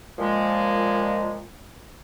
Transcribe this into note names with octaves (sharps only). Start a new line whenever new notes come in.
A#2 F3 G#3